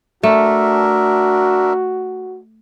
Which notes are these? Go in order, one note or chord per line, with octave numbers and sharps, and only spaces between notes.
A3 D4 F#4 A#4 E5